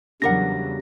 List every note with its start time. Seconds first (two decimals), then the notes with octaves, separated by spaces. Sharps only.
0.22 E2 C#3 F#3 G3 D4 A#4 F#5 A#6